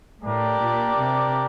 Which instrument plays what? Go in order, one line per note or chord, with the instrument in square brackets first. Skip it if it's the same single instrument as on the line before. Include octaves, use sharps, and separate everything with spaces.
[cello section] A2 [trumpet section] D4 G4 A#4 D5
[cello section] A#2
C3